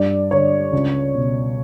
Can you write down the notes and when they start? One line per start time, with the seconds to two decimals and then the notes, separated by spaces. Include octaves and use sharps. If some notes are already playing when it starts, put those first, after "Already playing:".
Already playing: G2 D5
0.31 D3 C#5
0.73 C#2
1.15 B2